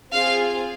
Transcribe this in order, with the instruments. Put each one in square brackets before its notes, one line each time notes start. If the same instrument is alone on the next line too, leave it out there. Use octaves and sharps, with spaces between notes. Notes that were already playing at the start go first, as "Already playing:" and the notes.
[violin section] C4 F4 G#4 F5